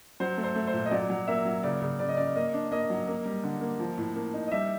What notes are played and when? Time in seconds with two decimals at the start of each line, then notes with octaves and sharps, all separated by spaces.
0.20 F#3 C5
0.38 A3
0.44 C5
0.56 A3
0.67 C5
0.74 A#2
0.85 D#5
0.91 F#3 D5
1.10 F#3
1.28 A#3 E5
1.45 F#3
1.63 C#3 D5
1.82 C#3
1.99 C#3 D5
2.09 D#5
2.17 C#4 D5
2.36 A#3 D#5
2.54 D4
2.72 A#3 D#5
2.90 F#3
3.08 A#3
3.26 G3
3.43 D3
3.61 A#3
3.80 F3
3.98 A2
4.16 A#3
4.34 D#4
4.47 D#5
4.51 G3 E5